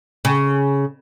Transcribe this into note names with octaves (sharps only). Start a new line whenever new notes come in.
C#3